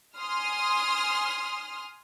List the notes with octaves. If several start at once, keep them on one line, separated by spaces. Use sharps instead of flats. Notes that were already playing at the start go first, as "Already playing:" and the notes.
G#5 C6 D#6 F6